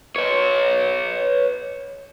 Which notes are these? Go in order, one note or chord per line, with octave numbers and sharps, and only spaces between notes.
B4 C#5